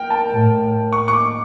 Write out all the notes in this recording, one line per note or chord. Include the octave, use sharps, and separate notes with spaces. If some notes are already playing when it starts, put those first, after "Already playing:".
Already playing: A#4 G5
A5
A2
C#6
C#6
D6